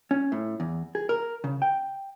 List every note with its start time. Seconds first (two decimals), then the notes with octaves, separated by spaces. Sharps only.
0.11 C#4
0.32 A2
0.60 E2
0.95 G#4
1.09 A#4
1.44 C#3
1.62 G5